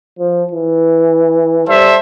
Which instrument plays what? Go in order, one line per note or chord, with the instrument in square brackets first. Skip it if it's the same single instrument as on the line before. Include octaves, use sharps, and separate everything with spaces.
[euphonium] F3
E3
[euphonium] G3 [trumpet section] A4 C5 E5